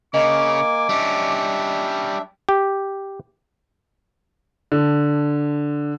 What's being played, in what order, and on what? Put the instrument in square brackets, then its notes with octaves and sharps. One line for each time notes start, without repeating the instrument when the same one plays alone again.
[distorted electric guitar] C#3 [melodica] A#3 G#5 [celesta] D#5 [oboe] D6
[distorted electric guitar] G3 C#4 [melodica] D4 E5
[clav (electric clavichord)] G4
[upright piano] D3